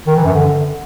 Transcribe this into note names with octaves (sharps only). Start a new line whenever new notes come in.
D#3
E3
F#2
D3